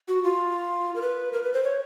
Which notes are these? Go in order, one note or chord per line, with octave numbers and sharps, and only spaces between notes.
F#4
F4
A#4
B4
A#4
B4
C5
C#5